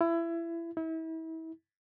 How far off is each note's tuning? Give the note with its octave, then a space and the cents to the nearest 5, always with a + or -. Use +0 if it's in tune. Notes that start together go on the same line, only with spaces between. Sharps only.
E4 +25
E4 -35